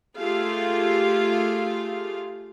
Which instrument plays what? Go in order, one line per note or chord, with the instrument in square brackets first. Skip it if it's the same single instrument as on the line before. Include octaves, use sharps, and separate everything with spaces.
[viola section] A3 F4 G4 G#4 F5